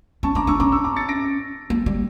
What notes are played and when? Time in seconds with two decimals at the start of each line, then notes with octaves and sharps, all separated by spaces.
0.23 C#4 A5 C#6
0.35 D4 A#5 D6
0.47 D4 C#6 E6
0.60 C#4 A#5 D6
0.72 C#6 E6
0.84 A#5 D6
0.96 A6 C#7
1.09 A#6 D7
1.70 A#3
1.86 G3